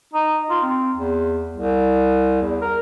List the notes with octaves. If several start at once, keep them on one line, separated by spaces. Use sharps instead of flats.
D#4
F4
C4
E2
C2
E2
A#4